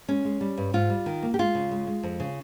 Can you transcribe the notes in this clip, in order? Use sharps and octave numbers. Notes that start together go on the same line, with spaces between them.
G#3 C#4
G#3
G3
G2
G#2 F4
G3
D#3
A#3
G4
G#3 F4
C#3
G#3
G#3
F2
C#3